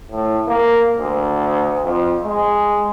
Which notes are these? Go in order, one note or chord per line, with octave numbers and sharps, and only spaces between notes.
A2
A#3
D2
F2
G#3